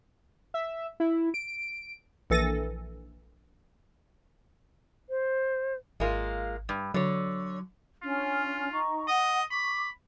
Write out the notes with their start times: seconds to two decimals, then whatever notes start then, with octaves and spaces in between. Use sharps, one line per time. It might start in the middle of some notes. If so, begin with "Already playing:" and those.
0.54 E5
1.00 E4
1.34 D7
2.30 A#1 E3 A4 A#6 D#7
5.10 C5
6.00 G#1 G#3 A#3 F4
6.69 G2
6.94 D3 F#3 C#5
8.03 C#4 D4 F4 F6
8.72 D#4 A#5 C#6
9.08 D#5 F#5
9.51 B5 C#6 D6